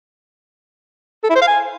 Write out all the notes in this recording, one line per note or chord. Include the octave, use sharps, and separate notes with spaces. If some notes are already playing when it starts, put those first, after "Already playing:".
A4
E4
C5
F5
G#5